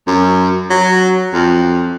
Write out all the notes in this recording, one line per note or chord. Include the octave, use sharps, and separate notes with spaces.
F#2
F#3
F2